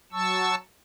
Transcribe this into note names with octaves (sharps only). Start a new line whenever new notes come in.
F#3 A5 C#6 E6